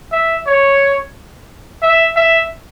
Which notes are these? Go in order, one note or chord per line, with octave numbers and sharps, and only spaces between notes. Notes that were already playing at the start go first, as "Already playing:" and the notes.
E5
C#5
E5
E5